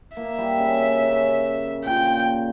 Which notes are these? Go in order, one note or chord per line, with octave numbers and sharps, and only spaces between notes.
A#3 E5
G3
C#3
C#3
C#3
A#2 G5